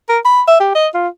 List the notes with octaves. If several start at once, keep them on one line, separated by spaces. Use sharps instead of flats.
A#4
B5
E5
G4
D#5
F4